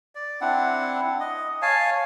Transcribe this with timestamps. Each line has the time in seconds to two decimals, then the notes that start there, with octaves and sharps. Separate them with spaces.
0.15 D5
0.41 C4 D4 E4 F#5
1.20 D#5
1.62 C#5 F5 G#5 A5